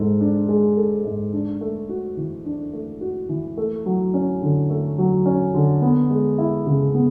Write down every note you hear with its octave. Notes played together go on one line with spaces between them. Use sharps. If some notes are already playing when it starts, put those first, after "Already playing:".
Already playing: G#2 G#3 A4
D4
G#3
A4
G#2
D4
A3
F#4
E3
D4
A3
F#4
E3
A3
F#3
C#4
D3
A3
F#3
C#4
D3
B3
G#3
E4
C#3
B3